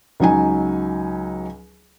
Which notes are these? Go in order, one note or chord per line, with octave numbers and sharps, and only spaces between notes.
C#2 F#3 D#4 G#5